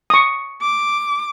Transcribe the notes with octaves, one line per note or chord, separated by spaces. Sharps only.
C#6 D#6
D6